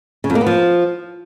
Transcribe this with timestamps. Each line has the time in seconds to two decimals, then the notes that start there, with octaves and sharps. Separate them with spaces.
0.24 C#3
0.30 F2
0.35 A#3
0.41 B3
0.46 F3